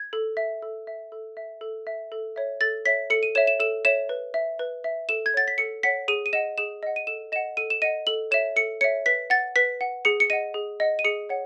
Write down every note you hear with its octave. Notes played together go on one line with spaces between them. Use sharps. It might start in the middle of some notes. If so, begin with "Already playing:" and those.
Already playing: G#6
A4
E5
A4
E5
A4
E5
A4
E5
A4
C#5 E5
A4 A6
C#5 E5 B6
A4 C#7
D#7
C#5 E5 E7
E7
A4 E7
C#5 E5 E7
B4
E5
B4
E5
A4 E7
G#6
C#5 F#5 A6
B6
A4 C#7
C#5 F#5 B6
G#4 D#7
D#7
D#5 F#5 E7
G#4 E7
D#5 F#5
D#7
A4 E7
D#5 F#5 E7
A4 D#7
E7
D#5 F#5 D#7
A4 F#7
C#5 E5 E7
A4 C#7
C#5 E5 C#7
B4 B6
F#5 A6
B4 B6
F#5
G#4 C#7
C#7
D#5 F#5 D#7
G#4
D#5 F#5
D#7
G#4 C#7
C#5 F#5